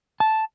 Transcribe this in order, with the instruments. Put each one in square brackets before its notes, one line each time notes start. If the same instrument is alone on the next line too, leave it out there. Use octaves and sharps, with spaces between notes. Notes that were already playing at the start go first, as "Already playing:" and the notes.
[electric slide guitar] A5